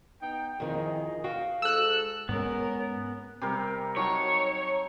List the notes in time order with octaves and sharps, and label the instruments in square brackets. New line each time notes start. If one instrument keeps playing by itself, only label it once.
[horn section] B3 D#4 G5
[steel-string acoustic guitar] F2 D#3 E3 [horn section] D#4 G#4 D#5
[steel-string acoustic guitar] F#4 F5 G5
[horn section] G#2 A4 [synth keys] E6 F#6
[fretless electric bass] G#2 G#3 [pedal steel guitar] B3 [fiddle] C#4 A#4
[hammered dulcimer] C3 G3 A#4
[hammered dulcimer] F#3 D#4 A5 [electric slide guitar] C#5